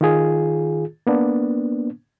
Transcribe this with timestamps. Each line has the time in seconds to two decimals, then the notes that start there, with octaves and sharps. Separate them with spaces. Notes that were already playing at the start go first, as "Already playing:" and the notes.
0.01 D#3 F4 G#4
1.07 A#3 B3 D4